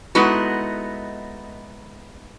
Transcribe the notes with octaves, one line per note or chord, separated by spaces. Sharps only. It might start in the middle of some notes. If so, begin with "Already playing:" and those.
G#3 A3 B3 D#4 E4 F#4